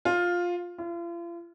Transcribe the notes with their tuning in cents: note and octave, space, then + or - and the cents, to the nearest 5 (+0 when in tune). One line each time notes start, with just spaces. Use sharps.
F4 +10
F4 -40